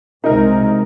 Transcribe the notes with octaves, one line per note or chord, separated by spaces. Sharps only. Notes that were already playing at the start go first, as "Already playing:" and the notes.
C2 C3 G#3 D#4 A#4